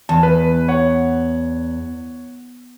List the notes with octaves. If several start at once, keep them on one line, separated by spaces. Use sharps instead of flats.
E2 A5
B4
C#5 F#5